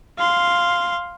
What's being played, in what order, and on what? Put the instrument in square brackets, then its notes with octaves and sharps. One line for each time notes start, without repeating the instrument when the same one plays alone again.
[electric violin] F5 C6